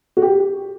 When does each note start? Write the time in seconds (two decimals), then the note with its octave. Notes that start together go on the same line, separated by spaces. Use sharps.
0.17 F#4
0.22 G4